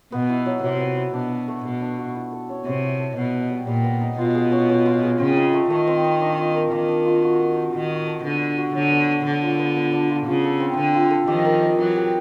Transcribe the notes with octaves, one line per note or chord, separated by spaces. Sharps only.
B2 B3
E4
F#3
C3 F#3
B3
E4
B2 D4
F#4
A3
B2 A3
D4
F#4
E4
A4
C#4
C3 C#4
E4
A4
B2 B3
D#4
G3
A#2 G3
B3
D#4
B2 F4
G#4
C#4
C#4
F4
G#4
C#3 C4
D#4
A3
D#3 A3
C4
D#4
D4
F4
A#4
D#3 A#3
D4
F4
F#4
A4
D#4
D#3 D#4
F#4
A4
D3 B3
D4
F#4
D3 F#3
B3
D4
D3 D4
F4
B3
B3
D4
F4
C#3 F4
A4
C4
D3 C4
F4
A4
D#3 F3 G4
A#4
D#5
E3 F#3 D#4
G4